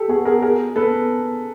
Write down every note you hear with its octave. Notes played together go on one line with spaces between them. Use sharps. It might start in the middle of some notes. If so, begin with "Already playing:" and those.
Already playing: G4 A4
B3 F#4 G#4
G#4 A#4
G#4 A#4
B3 A4 B4